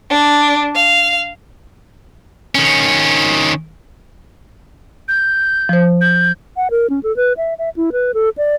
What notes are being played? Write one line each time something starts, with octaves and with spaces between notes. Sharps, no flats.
D4
F5
D#3 C#4
G6
F3 C5
G6
F#5
A#4
C#4
A4
B4
E5
E5
E4
B4
A4
D5